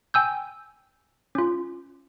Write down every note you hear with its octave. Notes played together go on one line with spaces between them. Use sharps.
G5 G#5 E6 G6
C#4 F4